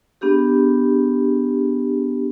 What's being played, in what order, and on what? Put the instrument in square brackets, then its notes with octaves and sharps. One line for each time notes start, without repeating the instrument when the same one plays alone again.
[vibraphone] B3 D4 G4 G#4